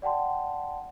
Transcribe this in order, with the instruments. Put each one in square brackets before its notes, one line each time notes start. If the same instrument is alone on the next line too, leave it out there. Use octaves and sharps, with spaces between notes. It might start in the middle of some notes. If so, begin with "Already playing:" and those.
[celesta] D5 F#5 G5 A5 C6